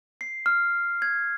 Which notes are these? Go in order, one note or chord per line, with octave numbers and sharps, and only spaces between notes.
C7
F6
G#6